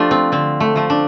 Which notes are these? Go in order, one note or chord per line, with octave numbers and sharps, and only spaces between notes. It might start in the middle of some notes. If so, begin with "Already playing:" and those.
Already playing: F3 A3 D4 F4 G4
C4
D3 C4
A3
F3 A3
D4